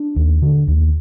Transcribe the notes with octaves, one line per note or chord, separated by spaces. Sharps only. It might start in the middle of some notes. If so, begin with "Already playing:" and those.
Already playing: D4
D#2
D3
D#2